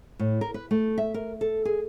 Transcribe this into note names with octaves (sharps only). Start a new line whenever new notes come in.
A2
A#4
B4
A3
E5
A#4
A4
G#4